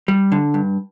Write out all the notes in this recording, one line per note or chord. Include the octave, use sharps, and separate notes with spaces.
G3
D3
G2